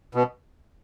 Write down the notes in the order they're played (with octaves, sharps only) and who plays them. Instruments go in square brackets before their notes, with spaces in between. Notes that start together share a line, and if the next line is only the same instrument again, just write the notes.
[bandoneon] B2